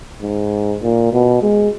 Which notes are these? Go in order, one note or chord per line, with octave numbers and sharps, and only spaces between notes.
G#2
A#2
B2
G#3